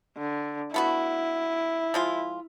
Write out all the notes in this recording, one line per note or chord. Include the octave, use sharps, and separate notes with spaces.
D3
A3 B3 E4 F#4
F3 G#3 F4